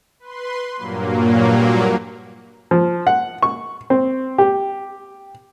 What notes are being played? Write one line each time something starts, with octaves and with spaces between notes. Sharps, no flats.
B4 C6
G2 A#2 F#3 A#3
F3
F#5
C#6
C4
G4